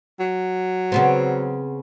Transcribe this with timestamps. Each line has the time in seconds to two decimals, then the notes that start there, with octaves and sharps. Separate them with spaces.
0.19 F#3
0.92 C#3 B3 C4